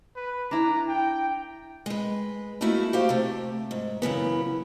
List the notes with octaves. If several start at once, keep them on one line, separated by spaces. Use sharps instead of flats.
B4
D4 E4 A#5
G5
G#3 B4
A3 A#3 D#4 E4 F#4 G#4
F#4 G4 C5 F5
C3 A3
G#2
F#2 C#3 E3 B3